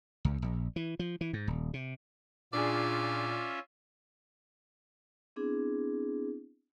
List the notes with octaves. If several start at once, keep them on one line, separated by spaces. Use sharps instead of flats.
C#2
A#1
E3
F3
E3
G#2
D#1
C3
A#2 C#4 D4 F4 G#4 D5 E5
B3 C4 D4 E4 G#4